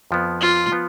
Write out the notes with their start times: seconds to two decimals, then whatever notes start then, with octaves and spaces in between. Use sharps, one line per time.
0.11 F2 F3 B3
0.41 F4
0.72 F3 B3